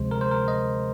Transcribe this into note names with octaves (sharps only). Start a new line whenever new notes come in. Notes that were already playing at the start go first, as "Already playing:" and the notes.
Already playing: D2 C3 F3 G#3 C5
A#4
C5
A#4
D#5